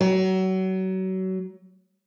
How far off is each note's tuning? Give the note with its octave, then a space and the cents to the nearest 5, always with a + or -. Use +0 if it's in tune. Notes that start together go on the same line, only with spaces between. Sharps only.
F#3 +30